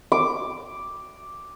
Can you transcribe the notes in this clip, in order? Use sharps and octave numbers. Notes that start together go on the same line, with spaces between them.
D6